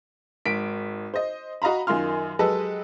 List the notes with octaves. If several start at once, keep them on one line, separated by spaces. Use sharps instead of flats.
G#1 B6 D7
C5 D#5
F#4 D#5 F5 A#5 B5
F#2 D#3 F4 C6 F6
F#3 G#3 G4 A4 B4 D#5